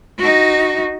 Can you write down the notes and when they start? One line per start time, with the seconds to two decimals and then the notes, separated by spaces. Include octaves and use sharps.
0.18 D#4 F#4